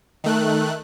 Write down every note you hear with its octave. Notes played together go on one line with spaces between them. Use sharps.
D#3 A3 F#6